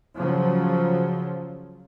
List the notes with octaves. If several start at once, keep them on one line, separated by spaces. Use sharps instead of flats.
C#3 F3 F#3